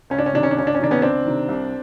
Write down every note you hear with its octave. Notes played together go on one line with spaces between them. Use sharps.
C#2 C#4
D4
C#4
C3 D#3 D4
C#4
D4
C#2 C#4
D4
C#4
C3 D#3 D4
B3 C#4
C#2 C4 D4
C3 D#3
C2